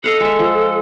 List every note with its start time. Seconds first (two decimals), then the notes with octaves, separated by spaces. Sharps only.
0.04 A4 D#5 F5 F#5
0.20 G#3 E5
0.39 F3